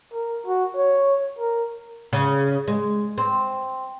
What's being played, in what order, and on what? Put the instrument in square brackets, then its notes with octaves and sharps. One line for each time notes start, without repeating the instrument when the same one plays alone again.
[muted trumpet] A#4
F#4
C#5
A#4
[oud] C#3
G#3
C4